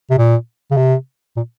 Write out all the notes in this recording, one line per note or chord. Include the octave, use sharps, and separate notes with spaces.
C3
A#2
C#3
C3
A#2